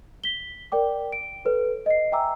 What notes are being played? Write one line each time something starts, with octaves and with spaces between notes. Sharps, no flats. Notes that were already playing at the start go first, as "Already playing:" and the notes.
B6 G7
A#4 D5 G5 D6
D7
A4 B4 C#5
D#5 C7
E5 G5 G#5 A#5 D6 E6